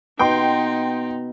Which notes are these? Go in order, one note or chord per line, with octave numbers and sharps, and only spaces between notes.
B2 D#4 G5 C6